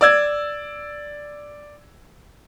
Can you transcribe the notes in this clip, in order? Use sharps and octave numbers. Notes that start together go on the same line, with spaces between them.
D5 E6 G#6